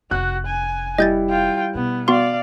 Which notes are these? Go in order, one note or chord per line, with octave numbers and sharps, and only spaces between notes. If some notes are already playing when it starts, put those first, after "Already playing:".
F1 F#4 F#6
G#5
G3 E4 D#5 G6 A6
F4 G5
B2 B3
B3 F#4 D5 F5 C6